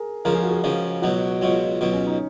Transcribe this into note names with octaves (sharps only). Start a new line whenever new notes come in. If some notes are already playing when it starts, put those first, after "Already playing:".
Already playing: G#4 A#4
C#2 C#3 F3 A#4
G#4
F#4
G#4
C#2 C#3 F3
C#2 B2 F#3 F#4
C#2 B2 F#3 F4
C#2 B2 F#3
C#4
D#4